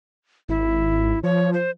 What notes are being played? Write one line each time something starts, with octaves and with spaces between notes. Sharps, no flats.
G#1 E4
F3 C#5
C5